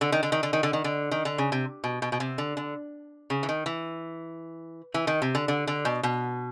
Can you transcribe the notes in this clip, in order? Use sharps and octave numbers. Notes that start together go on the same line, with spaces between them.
D3
D#3
D3
D#3
D3
D#3
D3
D#3
D3
D#3
D3
C#3
C3
B2
B2
B2
C3
D3
D3
C#3
E3
D#3
E3
E3
D#3
C3
D3
D3
D3
B2
B2